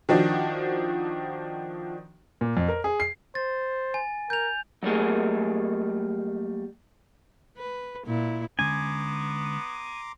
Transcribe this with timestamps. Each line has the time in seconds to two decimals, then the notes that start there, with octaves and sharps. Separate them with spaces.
0.09 D#3 F3 D4 F#4
2.41 A#2
2.57 F2
2.68 A#4
2.84 G#4
3.00 C7
3.35 C5 A6
3.94 G#5
4.30 A#4 G6 F7
4.83 F#3 G3 A3 A#3 G#4
7.57 B4
8.06 A#2 E4
8.59 D3 G#3 B3 C#4 G#5 A#5 C6 D6